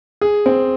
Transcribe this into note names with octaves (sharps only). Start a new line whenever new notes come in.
G#4
C4